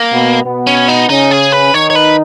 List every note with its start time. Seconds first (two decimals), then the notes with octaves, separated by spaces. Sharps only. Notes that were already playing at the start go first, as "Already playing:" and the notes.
Already playing: A#3
0.12 B2 B3
0.45 B2 B3
0.67 C#4
0.88 D#4
1.09 C#3 C#4 D#4
1.31 G#4
1.52 B4
1.74 D#3 D#4 C#5
1.90 C#5
1.95 B4